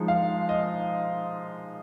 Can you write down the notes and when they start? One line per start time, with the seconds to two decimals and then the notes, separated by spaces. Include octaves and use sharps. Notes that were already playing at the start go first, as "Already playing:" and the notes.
Already playing: F3 G#3 D#4
0.08 F5
0.49 D#5